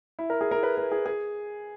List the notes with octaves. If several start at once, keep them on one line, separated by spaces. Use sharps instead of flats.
E4
A#4
G#4
A#4
B4
A#4
G#4
G#4